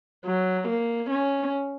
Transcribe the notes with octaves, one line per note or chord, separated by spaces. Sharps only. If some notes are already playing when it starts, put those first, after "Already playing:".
F#3
A#3
C#4